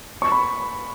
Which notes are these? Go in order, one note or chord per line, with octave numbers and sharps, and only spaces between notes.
C#6
B5